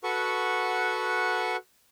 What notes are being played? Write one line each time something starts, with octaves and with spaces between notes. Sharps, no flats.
F#4 A4 B4 F#5 C#6